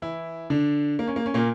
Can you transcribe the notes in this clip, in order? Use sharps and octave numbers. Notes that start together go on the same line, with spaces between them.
E3 E4
D3 D4
A#3
C#4
A#3
C#4
A#2 A#3